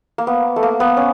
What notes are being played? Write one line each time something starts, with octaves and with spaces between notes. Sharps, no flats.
A#3
B3
A3
A#3
B3
C#4